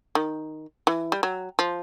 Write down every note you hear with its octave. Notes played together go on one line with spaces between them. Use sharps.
D#3
E3
G3
F#3
F3